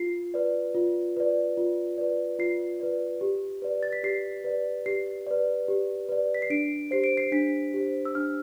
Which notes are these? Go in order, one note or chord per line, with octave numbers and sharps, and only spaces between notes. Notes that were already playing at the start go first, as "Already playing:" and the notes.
Already playing: F4 C7
B4 D5
F4
B4 D5
F4
B4 D5
F4 C7
B4 D5
G4
B4 D5
A6
B6
G4 C7
B4 D5
G4 C7
B4 D5
G4
B4 D5
B6
C7
D4 D7
G4 C5 C7
D7
C7
D4 B6
G4 C5
E6
D4 F6